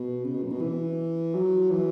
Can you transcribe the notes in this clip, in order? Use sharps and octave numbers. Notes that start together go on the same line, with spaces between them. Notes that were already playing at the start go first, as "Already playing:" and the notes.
Already playing: B2
C#3
B2
F#2
B2
E3
F#3
E3